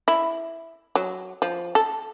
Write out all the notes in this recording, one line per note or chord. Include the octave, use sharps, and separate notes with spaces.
E4
F#3
F3
A4